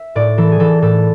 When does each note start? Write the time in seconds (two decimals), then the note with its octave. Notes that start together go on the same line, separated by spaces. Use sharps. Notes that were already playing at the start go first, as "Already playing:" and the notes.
Already playing: E5
0.15 A2 D5
0.38 E3 A4
0.52 G#4
0.60 E3 A4
0.82 A2 A4